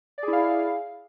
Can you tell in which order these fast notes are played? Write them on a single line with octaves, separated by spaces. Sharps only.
D5 G#4 E4 F5